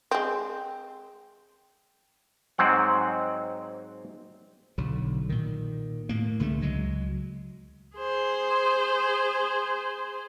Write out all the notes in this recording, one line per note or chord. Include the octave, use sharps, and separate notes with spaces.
G#3 C4
G#2 F#3 G#3 C4 F#5
B1 D3 F#3
A#2 D#3
A2 A#3
C2 D3 G#3 A3
C#2 F#3 G#3
G#4 C5